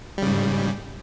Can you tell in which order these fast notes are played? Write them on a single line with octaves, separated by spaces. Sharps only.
G3 C#3 G#2